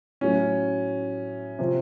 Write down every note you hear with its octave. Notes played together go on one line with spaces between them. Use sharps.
A2 F#3 C#4
C3 F3